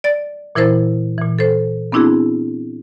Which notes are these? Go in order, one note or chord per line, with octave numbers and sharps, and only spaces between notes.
D5 A6
A#2 E3 E4 A#4 C5 A6
A#2 E3
A4 C5
B3 C4 D4 E4 F#4 G#4